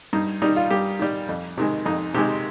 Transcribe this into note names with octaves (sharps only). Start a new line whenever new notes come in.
G2 D#4
D#3 G3 D#4
F4
G2 G4
D#3 G3
F2
C3 D#3 G#3
F2 D#4
C3 D#3 G#3 G4